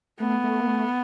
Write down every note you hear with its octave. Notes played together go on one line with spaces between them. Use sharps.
A3 B3
A3
A#3
A3